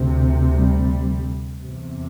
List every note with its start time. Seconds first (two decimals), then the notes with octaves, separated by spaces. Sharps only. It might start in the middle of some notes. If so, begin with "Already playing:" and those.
Already playing: D2 C3
0.56 G3
1.61 E2 C3